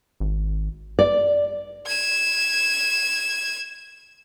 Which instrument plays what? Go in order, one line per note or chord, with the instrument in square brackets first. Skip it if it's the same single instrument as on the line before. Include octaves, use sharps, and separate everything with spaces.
[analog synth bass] G#1
[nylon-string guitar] D5
[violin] G#6 E7